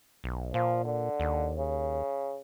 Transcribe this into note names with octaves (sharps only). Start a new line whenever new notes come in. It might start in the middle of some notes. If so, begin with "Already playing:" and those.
B1
A#2 F3
D3
D#2
C#3